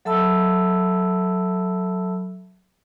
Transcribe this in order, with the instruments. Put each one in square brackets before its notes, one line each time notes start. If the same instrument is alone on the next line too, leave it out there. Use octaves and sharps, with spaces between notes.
[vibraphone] F#3 A4 E5 A5 B5 E6